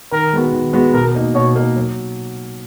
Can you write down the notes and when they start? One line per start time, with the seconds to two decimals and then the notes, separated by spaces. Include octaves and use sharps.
0.12 D#3 A#4
0.33 G#3 B3 F#4
0.52 D#3
0.73 G#3 B3 F#4
0.93 B2 A#4
1.15 A#3 D#4
1.35 B2 C#5
1.56 A#3 D#4
1.76 F#3